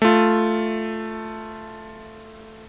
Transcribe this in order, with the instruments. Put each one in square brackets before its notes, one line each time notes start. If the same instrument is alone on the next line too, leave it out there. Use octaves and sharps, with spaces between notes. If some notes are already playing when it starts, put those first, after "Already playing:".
[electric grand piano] A3 F4